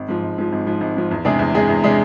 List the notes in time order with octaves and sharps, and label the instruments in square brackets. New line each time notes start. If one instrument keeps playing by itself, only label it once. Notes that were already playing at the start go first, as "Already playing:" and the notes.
Already playing: [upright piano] G#1
G#2 F3
G#1
G#2 F3
G#1
G#2 F3
G#1
G#2 F3
E2
C3 G#3 D4 G#4
E2
C3 G#3 D4 G#4
E2
C3 G#3 D4 G#4